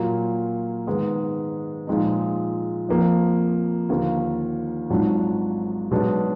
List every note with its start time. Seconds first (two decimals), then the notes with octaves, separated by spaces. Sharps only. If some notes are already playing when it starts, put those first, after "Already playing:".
Already playing: A#2 F#3 A#3 F4
0.87 G#2 D#3 G#3 B3
1.87 A#2 F3 G#3 D#4
2.89 F2 F3 A#3
3.89 D#2 D3 F3 A#3
4.90 G#1 G#2 F#3 D4 F4
5.91 B1 B2 G#3 D4